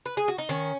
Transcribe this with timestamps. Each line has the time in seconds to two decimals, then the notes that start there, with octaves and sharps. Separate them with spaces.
0.06 B4
0.17 G#4
0.28 F#4
0.38 D#4
0.49 D#3 C#4